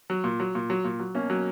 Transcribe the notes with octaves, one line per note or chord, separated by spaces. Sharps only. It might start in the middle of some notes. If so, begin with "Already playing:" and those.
F#3
A#2
F#3
A#2
F#3
A#2
F#3
B2 A#3 C#4
F#3